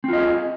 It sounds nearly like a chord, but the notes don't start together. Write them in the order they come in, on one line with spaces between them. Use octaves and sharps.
C4 F4 D#5 G#4